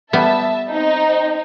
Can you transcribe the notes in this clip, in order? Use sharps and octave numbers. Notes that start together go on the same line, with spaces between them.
G3 B3 E5 A5
C4 D#4